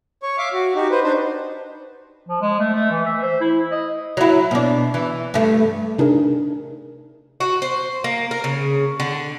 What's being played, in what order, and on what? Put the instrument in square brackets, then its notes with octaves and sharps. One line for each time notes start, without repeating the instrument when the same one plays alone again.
[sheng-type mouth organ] C#5 C#6
E5 F5 D6
F#4
D#4 F#4 G4
B4 C5
D4 D#4 C5
[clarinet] F3
G#3
A3
A3
E3
E5
C5
E4
D#5
[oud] F#3 E4
B2 D4
E3
G2 A3
[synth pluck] C3 D4 D#4 G#4 A#4
[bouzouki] F#4
C5
A#3
A#4
C#3
D3